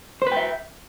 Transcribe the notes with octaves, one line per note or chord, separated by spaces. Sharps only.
B4 C5 E5 G5